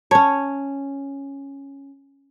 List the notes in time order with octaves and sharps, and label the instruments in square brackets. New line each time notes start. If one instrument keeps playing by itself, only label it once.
[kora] C#4 C#5 [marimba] A5